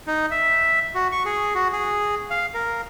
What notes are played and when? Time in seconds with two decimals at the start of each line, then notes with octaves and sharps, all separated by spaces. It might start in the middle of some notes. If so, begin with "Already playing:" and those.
0.07 D#4
0.31 E5
0.95 F#4
1.12 C#6
1.26 G#4
1.55 F#4
1.73 G#4
2.30 F5
2.54 A#4